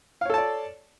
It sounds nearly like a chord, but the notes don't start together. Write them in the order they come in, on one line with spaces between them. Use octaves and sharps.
F5 C#5 A4 A5 D5